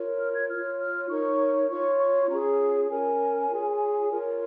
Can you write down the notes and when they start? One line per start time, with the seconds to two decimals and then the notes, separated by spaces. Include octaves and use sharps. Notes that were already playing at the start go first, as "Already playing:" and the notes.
Already playing: F4 A#4 C#5
0.19 F6
0.34 G#6
0.49 F4 C#5 F6
0.80 F6
1.09 D#4 A#4 C#5 C#6
1.69 F4 C#5 C#6
1.99 C#6
2.21 C#6
2.29 C#4 F4 G#4 C#5 A#5
2.90 C#4 A#4 C#5 G#5
3.50 F4 G#4 C#5
4.10 F4 A#4 C#5